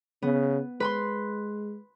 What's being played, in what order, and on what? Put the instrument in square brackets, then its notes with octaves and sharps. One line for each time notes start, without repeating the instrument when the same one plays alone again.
[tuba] C#3 [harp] B3
[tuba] G#3 [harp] B4 B5 C6